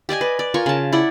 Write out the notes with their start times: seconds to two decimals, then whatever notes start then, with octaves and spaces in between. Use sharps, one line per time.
0.09 G4 D5 D#5 G#5
0.21 B4
0.39 D5
0.54 F4 A#4 G#5 C#6
0.66 C#3 A5
0.92 E4 D5 F#5